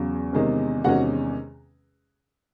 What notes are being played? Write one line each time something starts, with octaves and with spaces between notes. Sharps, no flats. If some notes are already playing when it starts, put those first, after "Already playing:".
Already playing: E2 C#3 F#3
E2 C3 D#3 G#3 C#4
E2 C3 D#3 G#3 C#4 F#4 F#5